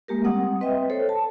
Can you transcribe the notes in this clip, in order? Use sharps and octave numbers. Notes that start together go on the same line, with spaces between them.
G#3 A#3 G4 A#4
G3 C4 F#5 D#6
C4 B4 D#5 E5 G5
A4 C5 C#5
A5